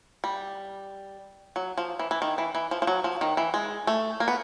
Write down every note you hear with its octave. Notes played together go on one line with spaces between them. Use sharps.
G3
F#3
F3
E3
E3
D#3
E3
E3
F3
F3
F#3
F3
D#3
E3
G#3
A3
A#3
B3